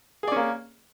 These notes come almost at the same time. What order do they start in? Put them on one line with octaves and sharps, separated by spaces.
G#4 D5 C#4 A#3